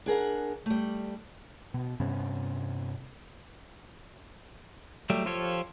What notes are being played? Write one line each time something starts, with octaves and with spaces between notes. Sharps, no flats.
D4 G#4 A#4 F#5
G3 A3
B2
G2 C3 B3 C#4
F#3 G3 A3 G4
F3 F4 G4 A4 C#5